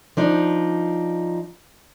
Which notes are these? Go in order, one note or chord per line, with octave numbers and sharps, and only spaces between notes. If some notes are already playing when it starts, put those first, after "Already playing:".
F3 D4 D#4